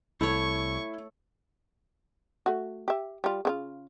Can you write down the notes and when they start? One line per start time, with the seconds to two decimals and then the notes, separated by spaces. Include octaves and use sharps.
0.21 C2 A3 E4 C#5 C#6
2.46 A3 F#4
2.88 G4 E5
3.24 G3 F4
3.45 C#3 C4 F4